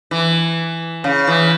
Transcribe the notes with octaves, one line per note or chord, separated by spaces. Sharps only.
E3
C#3
E3